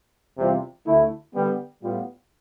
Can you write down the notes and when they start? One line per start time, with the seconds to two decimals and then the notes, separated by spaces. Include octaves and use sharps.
0.37 E2 C3 G3 C4 F4
0.85 D2 D3 A3 E4
1.33 D3 G3 B3
1.82 A2 G3 B3 F4